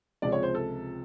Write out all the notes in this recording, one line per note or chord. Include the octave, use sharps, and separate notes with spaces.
C#2 C3 F3 G#3 D5
C#5
C5
A4